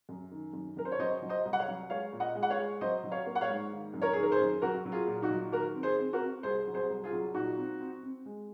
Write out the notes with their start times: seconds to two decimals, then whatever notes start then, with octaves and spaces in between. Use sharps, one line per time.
0.09 F#2
0.31 D#3
0.53 F#2
0.77 F#2 A#4
0.85 C5
0.92 C#5
0.99 F#3 C5 D#5
1.22 F#3
1.29 C5 D#5
1.45 C2
1.53 F#5
1.59 C#5 F5
1.68 F#3
1.90 G#3 C#5 F5
2.13 A#2
2.20 D#5 F#5
2.35 G#3
2.43 F#5
2.50 C#5 F5
2.58 G#3
2.81 F#3 C5 D#5
3.04 F#3
3.12 C#5 F5
3.26 A#3
3.35 F#5
3.41 C#5 F5
3.49 G#2
3.72 D#3
3.94 F#2
4.02 A#4 C#5
4.13 D#3 G#4
4.23 A#4
4.32 G#4 C5
4.40 F#2
4.62 F#3 F#4 A#4
4.85 F#3
4.92 F4 G#4
5.07 A#2
5.22 D#4 F#4
5.31 F#3
5.52 D#3 F#4 A#4
5.75 C4
5.83 G#4 C5
5.99 C4
6.13 F#4 A#4
6.22 C4
6.43 C2 G#4 C5
6.67 F#3
6.74 G#4 C5
6.90 C2
7.04 F4 G#4
7.12 F#3
7.34 A#2 D#4 F#4
7.57 C4
7.80 C4
8.03 C4
8.26 G#3